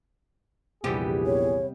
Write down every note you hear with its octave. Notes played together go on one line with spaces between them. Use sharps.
A#1 E2 C3 G3 B3 G4 G#4
C#5